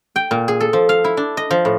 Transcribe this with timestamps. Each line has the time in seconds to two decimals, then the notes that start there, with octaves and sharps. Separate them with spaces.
0.16 G5
0.31 A#2
0.48 G#4
0.60 A4
0.73 F3
0.89 F5
1.04 E4
1.17 D4
1.37 D#5
1.51 F3
1.65 A2